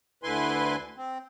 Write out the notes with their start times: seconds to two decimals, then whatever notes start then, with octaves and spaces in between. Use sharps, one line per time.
0.23 D2 D3 E4 B4 G#5 C6
0.97 C4